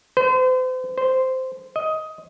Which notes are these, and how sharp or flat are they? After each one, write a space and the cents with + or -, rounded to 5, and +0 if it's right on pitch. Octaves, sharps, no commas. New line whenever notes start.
C5 -40
C5 -10
D#5 +15